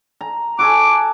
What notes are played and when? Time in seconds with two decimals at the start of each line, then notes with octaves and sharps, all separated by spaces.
0.21 A#5
0.59 F#4 A4 G#5 D6